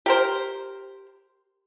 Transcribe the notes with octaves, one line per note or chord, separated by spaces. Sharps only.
G4 A#4 C5